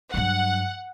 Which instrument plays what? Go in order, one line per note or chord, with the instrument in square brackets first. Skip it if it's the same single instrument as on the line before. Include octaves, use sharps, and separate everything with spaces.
[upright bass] G2 F#3 [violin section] F#5